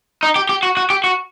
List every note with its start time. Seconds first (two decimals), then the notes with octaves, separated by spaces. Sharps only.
0.23 D#4
0.36 G4
0.49 G4
0.63 F#4
0.77 F#4
0.90 G4
1.04 F#4